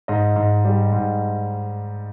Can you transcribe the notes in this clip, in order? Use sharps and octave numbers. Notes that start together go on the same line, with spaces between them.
G#2 D#5
G#2
G3
G#2